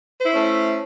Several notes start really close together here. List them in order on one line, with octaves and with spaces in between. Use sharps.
C5 E4 C#4 A3